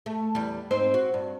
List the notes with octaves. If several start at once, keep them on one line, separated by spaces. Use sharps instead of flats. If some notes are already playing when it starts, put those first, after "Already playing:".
A3
E2 G3
G#2 C4 C5
F#4
G2